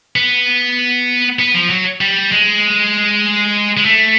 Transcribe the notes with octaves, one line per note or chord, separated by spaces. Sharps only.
B3
B3
F3
F#3
G3
G#3
G#3
A3